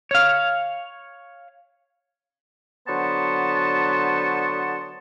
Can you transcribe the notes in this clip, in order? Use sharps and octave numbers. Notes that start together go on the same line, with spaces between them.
C#5 F5
D3 F#3 B3 C5 A5 C#6